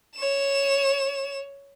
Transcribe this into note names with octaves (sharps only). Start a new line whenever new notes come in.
C#5 E7